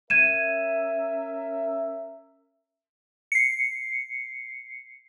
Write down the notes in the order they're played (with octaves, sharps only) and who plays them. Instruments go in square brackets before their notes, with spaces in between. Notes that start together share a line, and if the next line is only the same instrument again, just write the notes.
[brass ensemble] C#4 A#4 E5 [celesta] G#6 D#7 E7
[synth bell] C7 C#7